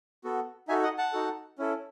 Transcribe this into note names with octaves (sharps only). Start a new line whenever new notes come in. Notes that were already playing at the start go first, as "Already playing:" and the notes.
B3 F#4 A4
D#4 F#4 A4 E5 G#5
D#5 F#5
F#5 A5
D#4 F#4 A4
C#4 E4 A4